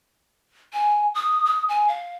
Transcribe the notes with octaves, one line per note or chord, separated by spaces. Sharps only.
G#5
D#6
D#6
G#5
F5